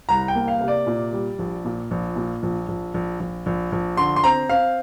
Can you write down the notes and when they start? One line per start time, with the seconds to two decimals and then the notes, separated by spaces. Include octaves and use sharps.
0.09 C2 A#5
0.28 G5
0.35 A#3
0.48 F5
0.61 C3
0.68 D5
0.87 A#2
1.13 G3
1.39 A#1
1.65 A#2
1.91 A#1
2.16 A#2
2.43 A#1
2.68 A#1
2.94 A#1
3.20 A#1
3.46 A#1
3.72 A#1
3.97 D3 C6
4.16 C6
4.24 C4 A#5
4.49 C4 F5